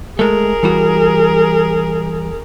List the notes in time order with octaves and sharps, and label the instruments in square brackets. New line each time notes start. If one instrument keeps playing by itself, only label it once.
[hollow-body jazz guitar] G#3 A3 [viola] G#4 A#4
[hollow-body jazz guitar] E3 G3 F#4